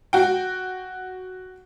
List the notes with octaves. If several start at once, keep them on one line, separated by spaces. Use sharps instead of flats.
F#4 G5